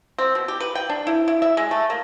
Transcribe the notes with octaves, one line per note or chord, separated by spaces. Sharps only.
C4
B2
G4
B4
G5
D4
E4
E4
E5
G#3
A3
A#3